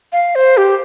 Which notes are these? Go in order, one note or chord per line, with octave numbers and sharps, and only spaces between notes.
F5
C5
G4